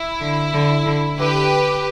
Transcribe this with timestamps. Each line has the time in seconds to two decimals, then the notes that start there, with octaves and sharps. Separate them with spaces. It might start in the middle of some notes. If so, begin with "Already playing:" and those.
Already playing: E4
0.21 D3
0.53 D3
0.85 D3
1.18 D3 G4 B4